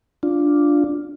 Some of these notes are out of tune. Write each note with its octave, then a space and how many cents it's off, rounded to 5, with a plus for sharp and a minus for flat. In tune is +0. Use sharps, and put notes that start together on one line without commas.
D4 -5 F4 +0